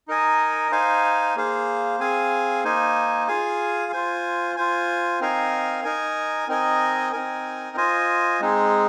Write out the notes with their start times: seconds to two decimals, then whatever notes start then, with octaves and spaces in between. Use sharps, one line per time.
0.08 D#4 A#4 D#5 G#5
0.71 D#4 C5 F5 G#5
1.36 A#3 G#4 C5 F5
2.00 C4 G#4 F5 G#5
2.64 A#3 D#4 C5 G#5
3.28 F4 G#4 F5 G#5
3.92 F4 C5 G#5
4.56 F4 C5 G#5
5.20 C4 D#4 A#4 F5 G#5
5.84 D#4 A#4 G#5
6.48 C4 D#4 A#4 D#5 G#5
7.13 C4 D#4 A#4 G#5
7.77 F4 C5 D#5 G#5
8.40 G#3 C4 D#4 G#4